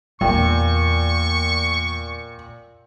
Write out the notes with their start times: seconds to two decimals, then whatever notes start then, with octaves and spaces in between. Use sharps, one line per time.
0.21 E2 A#2 G5 C#6